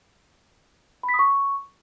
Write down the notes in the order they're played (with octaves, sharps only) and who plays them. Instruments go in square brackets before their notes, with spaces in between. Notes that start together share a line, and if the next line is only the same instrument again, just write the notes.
[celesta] B5
B6
D#6
C#6